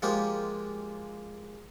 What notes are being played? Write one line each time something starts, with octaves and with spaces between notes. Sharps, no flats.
F3 G#3 A#3 F4 G4